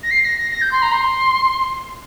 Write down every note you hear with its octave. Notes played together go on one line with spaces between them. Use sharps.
A#6
C7
A#6
A#6
A#6
G6
C6
A#5
C6